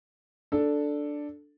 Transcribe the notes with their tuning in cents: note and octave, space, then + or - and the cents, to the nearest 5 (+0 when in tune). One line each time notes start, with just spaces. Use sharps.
D4 +0 A4 +0